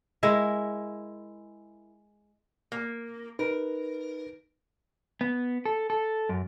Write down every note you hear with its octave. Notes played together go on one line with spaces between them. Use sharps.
G#3 E4 A#4
A#3
D#4 A#4 B4
B3
A4
A4
F#2